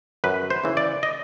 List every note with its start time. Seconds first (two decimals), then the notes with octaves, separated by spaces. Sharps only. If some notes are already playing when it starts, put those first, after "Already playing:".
0.24 F#2 B4
0.50 C5
0.64 C#3 E3
0.77 D5
1.03 D#5